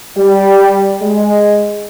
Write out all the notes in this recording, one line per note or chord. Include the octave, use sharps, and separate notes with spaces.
G3
G#3